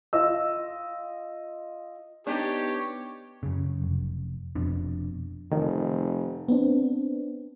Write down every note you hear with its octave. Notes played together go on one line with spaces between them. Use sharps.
F4 D#5 E6
B3 D4 D#4 G4 C#5
F#2 C#3
F1
F1 F2 B2 D4
F1 D#3
B3 C4 D4